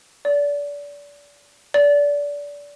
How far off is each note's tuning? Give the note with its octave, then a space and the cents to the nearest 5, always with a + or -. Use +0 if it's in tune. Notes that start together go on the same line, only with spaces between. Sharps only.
D5 -30
D5 -25